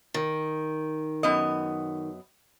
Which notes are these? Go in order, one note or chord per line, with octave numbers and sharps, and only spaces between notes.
D#3
F#2 B3 D#5